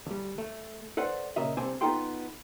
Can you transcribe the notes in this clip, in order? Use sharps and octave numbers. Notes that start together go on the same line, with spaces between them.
D2 G3
A3
A4 B4 C5 D5 F#5
A#2 C#3 A#4 D#5 E5
C2 D3 C4 D4 C5 G#5
B3 D#4 F4 A4 G5 C6